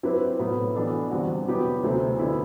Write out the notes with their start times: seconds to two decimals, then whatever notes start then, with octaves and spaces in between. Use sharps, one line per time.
0.03 F#3 C4 E4 G4 B4
0.39 A2 F#3 B3
0.75 E3 B3 D4 A4
1.11 E2 D3 G3 C4 F#4
1.47 B2 F#3 B3 E4 G4
1.83 D2 C3 F#3 A3 C4
2.19 D3 F#3 B3 E4